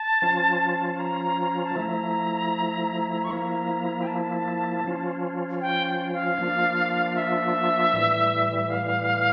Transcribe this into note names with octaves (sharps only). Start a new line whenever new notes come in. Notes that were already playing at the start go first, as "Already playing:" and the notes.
Already playing: A5
F3 C#4 F4
A#5
A5
F3 A3 E4 A#5
C#6
F3 A#3 E4 A#5
G5
A5
F3 C#4 F4
G5
G5
F5
F3 A#3 D4 F4
E5
A2 E3 G3
F5